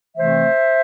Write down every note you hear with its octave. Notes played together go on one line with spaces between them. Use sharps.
C3 E3 A3 C4 C5 E5